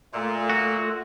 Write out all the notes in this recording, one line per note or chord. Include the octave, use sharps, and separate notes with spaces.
A#2 A3 F4 A4
F#4